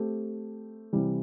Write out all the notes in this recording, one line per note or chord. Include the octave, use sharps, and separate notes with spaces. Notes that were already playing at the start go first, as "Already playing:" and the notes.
Already playing: A3 C4 G4
C3 E3 G3